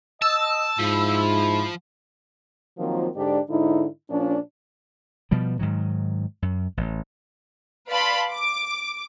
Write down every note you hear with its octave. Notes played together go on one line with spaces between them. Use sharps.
D#5 A5 E6
G#2 F3 E4
D#3 F3 F#3 A#3 C4 F4
G#2 D3 D4 G4 D5
G#2 D3 D#4 E4
A#2 F3 C#4 D4
B2 F3 G3
G#2 D#3 F#3
F#2
A1
B4 D5 F5 A5 B5 C6
D6